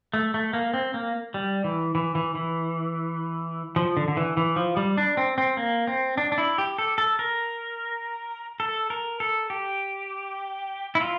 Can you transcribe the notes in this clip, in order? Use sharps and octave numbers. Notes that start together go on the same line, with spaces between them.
A3
A3
A#3
C4
A#3
G3
E3
E3
E3
E3
F3
D3
D3
E3
E3
F3
G3
D4
C4
C4
A#3
C4
D4
D4
E4
G4
A4
A4
A#4
A4
A#4
A4
G4
E4
F4